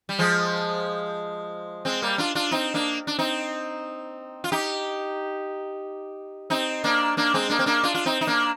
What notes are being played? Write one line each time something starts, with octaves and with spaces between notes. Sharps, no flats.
G3
F3 G#3
G#3 C4
G3 A#3
D4 F4
D4 F4
C4 D#4
A#3 D4
D4
C4 D#4
F4
D#4 G4
C4 D#4
A#3 D4
A#3 D4
G#3 C4
A#3 D4
C4
A#3 D4
D4 F4
F4
C4 D#4
D#4
A#3 D4